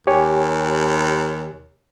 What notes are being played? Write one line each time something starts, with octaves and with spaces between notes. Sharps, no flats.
D#2 G4 C#5 G#5